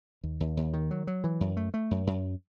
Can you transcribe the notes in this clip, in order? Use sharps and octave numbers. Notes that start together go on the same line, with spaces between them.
D#2
D#2
D#2
D#3
F#3
F#3
E3
F#2
A3
A3
F#2
F#2